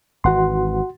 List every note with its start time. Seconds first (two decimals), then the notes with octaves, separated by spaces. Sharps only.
0.24 G#1 E3 F#4 F#5 C6